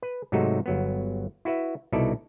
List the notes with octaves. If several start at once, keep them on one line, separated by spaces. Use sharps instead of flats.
B4
G#2 C3 F#3 A3 D#4 F#4
G1 F#3 B3
E4 F#4 B4 E5
C2 B2 D#4 E4 A4 D5